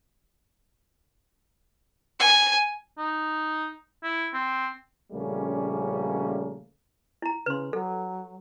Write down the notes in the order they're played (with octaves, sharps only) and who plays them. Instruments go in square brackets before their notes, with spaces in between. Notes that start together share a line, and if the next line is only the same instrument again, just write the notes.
[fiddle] G#5
[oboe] D#4
E4
C4
[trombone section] A#1 C#3 G3 A3 A#3 C#4
[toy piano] E4 A#5
[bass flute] C#3 [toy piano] B4 C6
[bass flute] F#3 [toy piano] A4